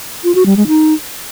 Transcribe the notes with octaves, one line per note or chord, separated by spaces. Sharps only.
F4
F#4
G3
G#3
D#4